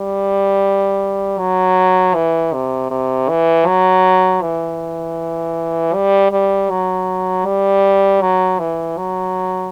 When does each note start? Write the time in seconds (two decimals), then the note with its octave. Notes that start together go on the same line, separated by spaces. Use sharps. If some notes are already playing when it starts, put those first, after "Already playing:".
Already playing: G3
1.39 F#3
2.15 E3
2.53 C3
2.91 C3
3.29 E3
3.67 F#3
4.42 E3
5.94 G3
6.32 G3
6.70 F#3
7.45 G3
8.21 F#3
8.59 E3
8.97 F#3